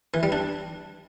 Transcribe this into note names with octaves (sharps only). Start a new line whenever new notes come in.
E3
G3
D4